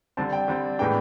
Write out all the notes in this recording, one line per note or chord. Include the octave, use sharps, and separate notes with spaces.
D3 G3 C4 A5
G5
D3 G3 C4
A2 E3 G#3 B3 D4 G5